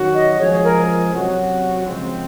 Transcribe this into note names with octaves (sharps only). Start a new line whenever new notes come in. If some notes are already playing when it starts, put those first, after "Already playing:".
Already playing: D#3 F#3 C#4 F#4
D#5
F3 G#3 C4 F4 G#4 C#5
A#4
C3 F#3 C#4 F#4
C#3 F3 G#3 C4